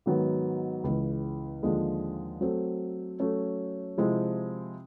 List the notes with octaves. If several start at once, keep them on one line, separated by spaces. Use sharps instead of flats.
G#2 D#3 F#3 B3
C#2 C#3 E3
D#2 D3 F3 G#3
F#3 A3 C4
F#3 A3 C#4
C3 F3 G#3 C4 E4